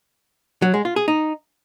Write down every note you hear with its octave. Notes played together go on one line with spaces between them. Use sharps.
F#3
G#3
F4
G#4
D#4